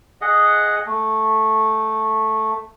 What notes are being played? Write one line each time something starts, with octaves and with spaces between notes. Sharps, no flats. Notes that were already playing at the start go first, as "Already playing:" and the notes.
G#4 D#5 F#5
A3